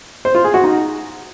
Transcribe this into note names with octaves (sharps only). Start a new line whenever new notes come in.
C5
F4
G#4
F#4
D#4